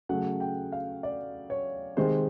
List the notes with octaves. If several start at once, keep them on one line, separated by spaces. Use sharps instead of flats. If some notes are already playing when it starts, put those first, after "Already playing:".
C#3 F#3 A3 F#5
G5
F5
D5
C#5
C3 D#3 G#3 C5